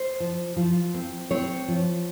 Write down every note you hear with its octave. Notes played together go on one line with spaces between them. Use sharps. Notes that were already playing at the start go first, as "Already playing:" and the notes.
Already playing: C5
F3
F3
C4
C4 C#5
F3